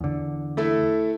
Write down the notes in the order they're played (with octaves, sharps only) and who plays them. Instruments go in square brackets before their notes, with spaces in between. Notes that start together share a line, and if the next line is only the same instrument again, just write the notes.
[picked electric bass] E2 D3
[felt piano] A3 E4 A4